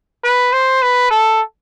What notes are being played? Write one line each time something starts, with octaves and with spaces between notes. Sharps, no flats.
B4
C5
B4
A4